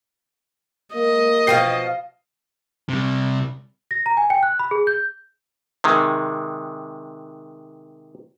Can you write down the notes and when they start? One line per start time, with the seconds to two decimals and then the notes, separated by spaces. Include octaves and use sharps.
0.95 A#3 D#5
1.47 B2 F3 F5 G5 C7
2.89 C3 G3
3.91 A#6
4.06 A#5
4.17 G#5
4.30 G5
4.43 F#6
4.59 B5
4.71 G#4
4.87 G6
5.84 C3 D#3 G#3